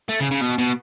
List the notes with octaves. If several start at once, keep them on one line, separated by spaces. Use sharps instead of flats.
A3
C#3
C#3
B2
B2